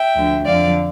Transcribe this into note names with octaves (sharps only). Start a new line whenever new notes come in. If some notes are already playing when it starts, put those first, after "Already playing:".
Already playing: E5 G5
D2 D3 F3
F2 D3 F3 D5 F5